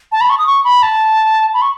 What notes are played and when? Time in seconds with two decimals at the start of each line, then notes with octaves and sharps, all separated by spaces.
0.12 A5
0.21 B5
0.30 C#6
0.38 D#6
0.47 C#6
0.64 B5
0.83 A5
1.54 B5
1.62 C#6